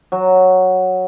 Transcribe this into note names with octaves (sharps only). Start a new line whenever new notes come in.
F#3